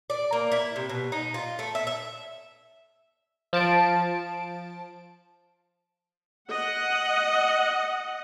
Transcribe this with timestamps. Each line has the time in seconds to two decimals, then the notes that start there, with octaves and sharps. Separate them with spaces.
0.10 D5
0.33 A#3
0.52 E4
0.76 C3
0.89 B2
1.12 D#4
1.34 F4
1.59 A3
1.75 E5
1.87 E5
3.53 F3 A5 D7
6.51 D#5 F#5